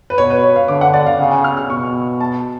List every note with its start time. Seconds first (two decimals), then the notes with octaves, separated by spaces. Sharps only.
0.10 B4
0.18 B2 C#5
0.30 B4
0.43 C#5
0.56 F5
0.68 D3 D6
0.81 F#5
0.94 D5
1.06 F5
1.19 C#3 F#5
1.31 G#5
1.44 F6
1.57 F6
1.70 B2 C#6
2.21 A5